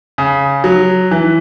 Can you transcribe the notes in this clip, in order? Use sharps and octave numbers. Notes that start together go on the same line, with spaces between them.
C#3
F#3
E3